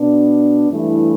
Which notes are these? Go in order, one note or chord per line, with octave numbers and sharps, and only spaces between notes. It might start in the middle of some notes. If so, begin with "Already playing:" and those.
Already playing: B2 B3 D4
G2 E3 A3 E4